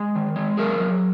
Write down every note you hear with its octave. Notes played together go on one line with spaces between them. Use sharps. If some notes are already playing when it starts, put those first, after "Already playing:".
Already playing: G#3
D#3
G#3
F#3 G#4 A#4
F#3